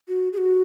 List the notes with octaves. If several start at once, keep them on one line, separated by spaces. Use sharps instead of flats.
F#4
G#4
F#4